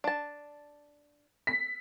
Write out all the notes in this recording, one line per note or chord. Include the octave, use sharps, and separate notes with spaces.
D4 A5
B6